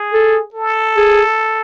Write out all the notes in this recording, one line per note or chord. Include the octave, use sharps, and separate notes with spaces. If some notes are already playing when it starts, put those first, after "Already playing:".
Already playing: G#4
A4
A4
G#4